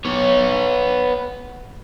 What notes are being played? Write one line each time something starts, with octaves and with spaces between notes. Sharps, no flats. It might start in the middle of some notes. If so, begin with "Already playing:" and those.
B3 C#5